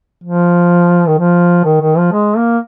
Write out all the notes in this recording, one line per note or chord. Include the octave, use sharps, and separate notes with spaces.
F3
D#3
F3
D#3
D#3
F3
G#3
A#3